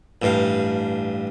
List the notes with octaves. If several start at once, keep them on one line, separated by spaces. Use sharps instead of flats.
A1 G2 F5